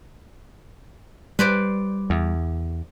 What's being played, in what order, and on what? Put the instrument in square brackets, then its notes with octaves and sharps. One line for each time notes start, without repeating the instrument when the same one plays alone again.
[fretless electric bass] G3 [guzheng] B4 C5 D5
[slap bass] E2